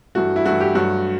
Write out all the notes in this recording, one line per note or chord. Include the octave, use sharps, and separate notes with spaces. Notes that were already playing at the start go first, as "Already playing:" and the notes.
G2 E3 A3 F#4
E4
G2 E3 A3 F#4
G4
G2 F#3 A3 F#4